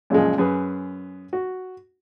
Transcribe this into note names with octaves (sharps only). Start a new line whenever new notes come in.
F#2 A#2 C#3 F3 G#3
F#2 G#4 B4
F#4